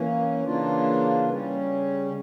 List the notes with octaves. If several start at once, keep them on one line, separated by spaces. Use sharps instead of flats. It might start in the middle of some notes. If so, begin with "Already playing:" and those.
Already playing: E3 A#3 C#4
C#3 E3 A#3 D4 F4
C#3 G3 C#4